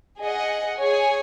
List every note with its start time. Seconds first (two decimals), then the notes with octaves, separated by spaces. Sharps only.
0.20 G#4 D#5 F#5
0.78 G#4 C#5 G#5